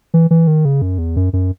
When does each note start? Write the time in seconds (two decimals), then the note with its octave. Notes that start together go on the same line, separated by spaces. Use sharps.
0.14 E3
0.31 E3
0.47 D#3
0.65 C#3
0.82 F#2
0.98 E2
1.16 F#2
1.33 F#2